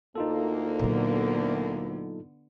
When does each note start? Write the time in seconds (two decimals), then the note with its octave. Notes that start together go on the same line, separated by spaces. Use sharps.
0.15 D2 A#3 D#4 F4 A4
0.79 A#2 D3 F#3 B3